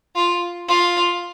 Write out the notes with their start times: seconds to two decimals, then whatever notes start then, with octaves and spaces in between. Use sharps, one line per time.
0.15 F4
0.68 F4